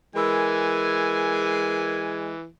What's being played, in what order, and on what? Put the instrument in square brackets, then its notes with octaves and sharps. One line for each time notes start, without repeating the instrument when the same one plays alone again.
[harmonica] E3 [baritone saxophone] G#3 [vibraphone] A#4 B5 E6 [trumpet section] G#5